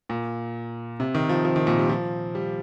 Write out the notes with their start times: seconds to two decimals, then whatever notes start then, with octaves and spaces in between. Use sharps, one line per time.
0.09 A#2
1.00 C3
1.15 D#3
1.29 F3
1.45 F3
1.56 D#3
1.67 A#2
1.79 G3
1.90 F3
2.35 G3